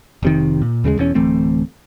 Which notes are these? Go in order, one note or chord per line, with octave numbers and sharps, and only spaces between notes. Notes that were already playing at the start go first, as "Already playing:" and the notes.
F1 C3 D#3
A#2
D#2 C#3 G3 G#3
E1 E2 A#2 C#4
D1 E3 A3 C4